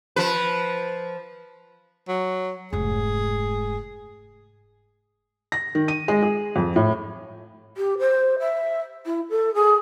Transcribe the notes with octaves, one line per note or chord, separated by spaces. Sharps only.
F3 B4
F#3
F1 G#2 G#4
A#6
D#3
D#7
G#3
G#4
F2
A2
G4
C5
E5
E4
A4
G#4